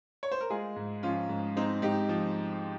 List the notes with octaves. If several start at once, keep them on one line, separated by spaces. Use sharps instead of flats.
C#5
C5
A#4
G#3 F4 G#4
G#2
F3 C#4 F4
G#2
G#3 C4 D#4
G#2 D#4 G4
F3